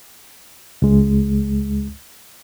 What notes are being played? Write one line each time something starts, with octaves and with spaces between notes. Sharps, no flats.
C#2 G#3